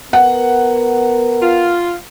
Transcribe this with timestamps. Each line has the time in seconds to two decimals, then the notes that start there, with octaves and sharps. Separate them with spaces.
0.13 B3 A#4 F#5
1.41 F4